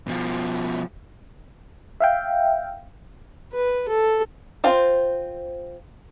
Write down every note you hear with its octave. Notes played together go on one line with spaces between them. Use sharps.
B2 F3
E5 F5 G5
B4
A4
C4 F4 C5